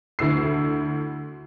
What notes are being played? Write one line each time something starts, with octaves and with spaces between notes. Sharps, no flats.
D2 E4 E6 C7